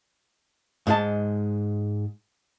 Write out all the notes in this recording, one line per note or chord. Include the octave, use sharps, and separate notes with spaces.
G#2 G#3 A5